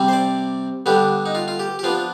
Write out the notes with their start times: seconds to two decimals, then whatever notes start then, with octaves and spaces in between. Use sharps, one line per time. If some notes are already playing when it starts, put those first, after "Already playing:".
Already playing: C3 G3 C4
0.08 C5
0.13 D5
0.86 D3 G3 B3 D4 G4
1.26 D#4
1.35 F4
1.48 F4
1.59 G4
1.79 G4
1.83 F3 B3 D4 F4